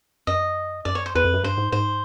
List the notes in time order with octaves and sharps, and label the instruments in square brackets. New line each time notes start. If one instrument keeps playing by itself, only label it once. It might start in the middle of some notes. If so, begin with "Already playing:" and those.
[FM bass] F#2 [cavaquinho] D#5
[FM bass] F#2 [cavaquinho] D5
[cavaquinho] C#5
C5
[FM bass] E2 [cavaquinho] B4
[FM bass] F2
F#2
[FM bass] G2 [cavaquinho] C5
[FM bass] G#2
[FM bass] G#2 [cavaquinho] C5